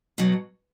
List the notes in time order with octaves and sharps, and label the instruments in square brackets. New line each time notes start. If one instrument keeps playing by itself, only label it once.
[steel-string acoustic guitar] B2 F#3